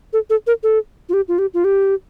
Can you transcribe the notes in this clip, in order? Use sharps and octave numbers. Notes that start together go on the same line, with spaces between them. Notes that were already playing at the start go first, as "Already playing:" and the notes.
A4
A4
A#4
A4
F4
G4
F4
G4
F4
G4